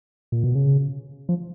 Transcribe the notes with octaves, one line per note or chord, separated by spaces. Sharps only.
A#2
B2
C#3
F3